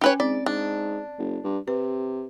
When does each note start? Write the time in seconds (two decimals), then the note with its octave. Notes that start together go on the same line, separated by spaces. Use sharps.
0.01 C#4 G4 B4 C#5 G#5
0.20 G#2 C4 D5
0.46 G#2 D4
1.19 F#1
1.44 G2
1.68 C3 B4